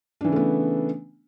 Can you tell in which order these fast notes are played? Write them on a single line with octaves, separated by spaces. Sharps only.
D4 E3 C#3 A3 B3